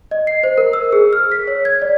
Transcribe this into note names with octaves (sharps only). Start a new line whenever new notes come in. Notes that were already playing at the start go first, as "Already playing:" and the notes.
D#5
C7
C5
A#4
E6
G#4
F6
B6
C#5
G#6
D5